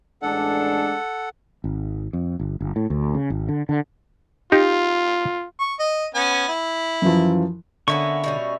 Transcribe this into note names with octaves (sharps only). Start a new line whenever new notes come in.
A1 G#3 D4 A4 F#5
G#1
F2
G1
G1
A2
D2
C#3
G#1
D3
D3
D#4 F4 G4
C#6
D#5
B3 C#4 G#5
E4
F#2 E3 F3
D3 A#3 B3 C#4 E5 C#6
B2 G3 C#4